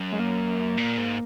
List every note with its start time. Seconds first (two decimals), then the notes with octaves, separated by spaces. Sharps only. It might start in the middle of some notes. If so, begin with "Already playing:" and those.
Already playing: F#2
0.12 G#3
0.20 A#3
0.78 A#2
0.98 G#2